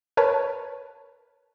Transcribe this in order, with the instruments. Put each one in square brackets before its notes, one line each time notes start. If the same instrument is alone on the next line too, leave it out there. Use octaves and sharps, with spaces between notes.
[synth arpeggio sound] A#4 B4 C#5 A5 B5